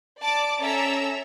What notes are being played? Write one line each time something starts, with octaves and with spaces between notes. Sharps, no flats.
D5 A5 D6
C#4 A4 E5 A#5 E6